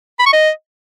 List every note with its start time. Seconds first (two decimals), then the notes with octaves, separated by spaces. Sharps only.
0.19 B5
0.26 C#6
0.33 D#5